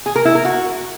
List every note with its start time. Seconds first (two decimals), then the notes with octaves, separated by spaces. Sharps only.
0.06 G#4
0.16 A#4
0.25 E4
0.35 A#4
0.45 F#4